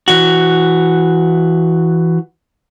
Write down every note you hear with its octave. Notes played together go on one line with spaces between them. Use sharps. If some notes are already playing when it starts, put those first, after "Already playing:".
E3 F#4